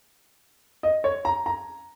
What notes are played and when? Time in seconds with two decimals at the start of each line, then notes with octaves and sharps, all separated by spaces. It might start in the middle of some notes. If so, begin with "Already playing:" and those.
0.83 D#5
1.04 C#5
1.25 A#5
1.46 A#5